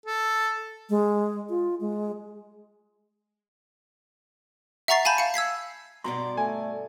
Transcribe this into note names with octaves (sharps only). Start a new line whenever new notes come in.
A4
G#3
F4
G#3
E5 F#5 A#5 C#6 A6 C7
F5 G#5 A5 B5 G6
F5 C#7
E6 G#6 B6 C7
G2 B2 F#4 D5 A#5 C6
A3 G#5